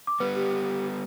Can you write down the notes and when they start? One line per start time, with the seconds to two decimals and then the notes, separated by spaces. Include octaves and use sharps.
0.07 D6
0.20 G3 B3 B4
0.35 G4